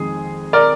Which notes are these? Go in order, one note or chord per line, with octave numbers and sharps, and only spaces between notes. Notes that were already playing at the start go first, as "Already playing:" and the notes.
Already playing: F2 D#3 G#3 G#4
A#4 D5